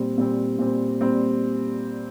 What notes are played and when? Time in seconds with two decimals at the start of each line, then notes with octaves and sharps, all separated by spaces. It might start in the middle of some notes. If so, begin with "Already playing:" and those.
Already playing: A#2 G3 C4
0.18 A#2 G3 C4
0.59 A#2 G3 C4
1.01 A#2 G3 C4